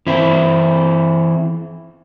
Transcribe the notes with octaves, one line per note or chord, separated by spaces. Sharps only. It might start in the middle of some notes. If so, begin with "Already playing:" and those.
E3 C4 E4